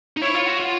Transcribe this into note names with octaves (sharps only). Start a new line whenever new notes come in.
D#4
E4 C#5
F4
F#4
F4